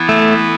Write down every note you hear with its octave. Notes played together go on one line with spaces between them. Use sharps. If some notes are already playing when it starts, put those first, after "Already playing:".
Already playing: E3 B3 E4
A3